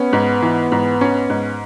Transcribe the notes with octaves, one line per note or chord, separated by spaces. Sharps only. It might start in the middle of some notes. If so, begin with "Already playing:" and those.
Already playing: B3 C#4
G#2
E3
G#2
C#4
G#2